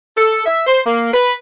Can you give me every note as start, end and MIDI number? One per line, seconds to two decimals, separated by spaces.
0.17 0.42 69
0.46 0.63 76
0.67 0.81 72
0.85 1.10 58
1.14 1.34 71